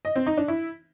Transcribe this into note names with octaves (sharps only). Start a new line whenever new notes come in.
D#5
C4
D#4
D4
E4